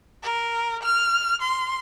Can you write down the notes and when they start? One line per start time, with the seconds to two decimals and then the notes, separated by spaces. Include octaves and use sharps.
0.23 A#4
0.83 F6
1.42 C6